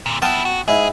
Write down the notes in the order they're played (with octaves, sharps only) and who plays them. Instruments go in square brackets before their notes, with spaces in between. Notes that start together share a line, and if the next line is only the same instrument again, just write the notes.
[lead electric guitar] A#2 D3
[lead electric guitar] F3 E4 [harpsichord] B3 G5 A5
[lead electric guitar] F#4
[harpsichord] G#2 E4 [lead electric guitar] G#4